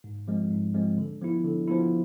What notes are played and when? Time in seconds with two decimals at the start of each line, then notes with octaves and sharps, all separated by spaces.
0.04 G#2
0.28 F3 G#3 C4
0.51 G#2
0.74 F3 G#3 C4
0.98 D3
1.21 F3 B3 E4
1.45 D3
1.68 F3 B3 E4